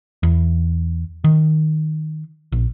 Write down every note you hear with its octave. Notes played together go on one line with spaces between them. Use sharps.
E2
D#3
A#1